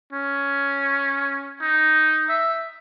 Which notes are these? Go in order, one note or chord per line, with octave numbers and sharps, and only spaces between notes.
C#4
D#4
E5